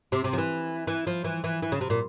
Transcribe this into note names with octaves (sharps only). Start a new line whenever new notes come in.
C3
C3
F3
E3
E3
F3
E3
E3
E3
C#3
C3
A#2